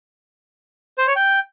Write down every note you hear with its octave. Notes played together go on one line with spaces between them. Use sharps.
C5
C#5
G5